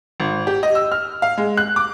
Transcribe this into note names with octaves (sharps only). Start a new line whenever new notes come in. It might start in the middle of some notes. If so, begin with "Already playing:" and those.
G#1
G4
D#5
E6
F6
F5
G#3
F#6
D6